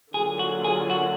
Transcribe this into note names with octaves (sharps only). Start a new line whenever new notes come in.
D3 F#3 A#3 F4 G#4
F#4
G#4
F#4